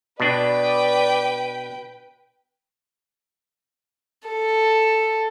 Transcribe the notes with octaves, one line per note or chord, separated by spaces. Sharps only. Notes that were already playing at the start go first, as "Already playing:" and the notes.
B2 D4 B4 D5 G5
A4